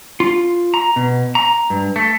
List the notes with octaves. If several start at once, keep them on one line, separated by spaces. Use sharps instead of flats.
F4
A#5
B2
A#5
G2
A3